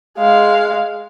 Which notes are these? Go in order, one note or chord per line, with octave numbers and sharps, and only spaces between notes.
G#3 F5